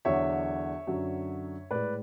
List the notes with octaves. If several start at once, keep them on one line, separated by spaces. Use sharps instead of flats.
E2 D3 F#3 C#5 E5
F#2 D3 F#3
A2 G#3 B4 D5